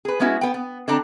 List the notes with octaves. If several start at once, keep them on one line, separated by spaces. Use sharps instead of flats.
G#4 B4
G#3 B3 C#4 E4 F#4
B3 G5
B3
D3 C4 D4 A5 A#5